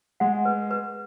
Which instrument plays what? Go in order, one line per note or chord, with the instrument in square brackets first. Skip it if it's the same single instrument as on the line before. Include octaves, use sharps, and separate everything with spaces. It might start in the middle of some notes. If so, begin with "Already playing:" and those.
[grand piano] G#3 [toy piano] F#5
[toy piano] B4
B4